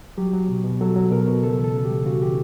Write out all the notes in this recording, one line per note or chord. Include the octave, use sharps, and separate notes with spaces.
F#3 G4
F#3
B2
B2
F#3 A4
F#3
B2 A#4
B2
C#3 A4
E3
A4
C#3
G4
G3
C#3 F#4
E3 G4